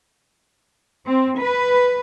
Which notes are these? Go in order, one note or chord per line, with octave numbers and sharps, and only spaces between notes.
C4
B4